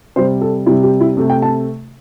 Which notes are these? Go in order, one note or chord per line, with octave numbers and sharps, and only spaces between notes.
C3 G3 C5
A4
C3 G3 E4
G4
E4
C3 A3 G4
G5
A5